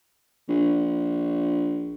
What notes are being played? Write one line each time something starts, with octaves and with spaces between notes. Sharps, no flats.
A#1